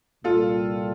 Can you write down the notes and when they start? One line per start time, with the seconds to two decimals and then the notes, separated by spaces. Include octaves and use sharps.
0.23 C2 A#2 G3 F4 A4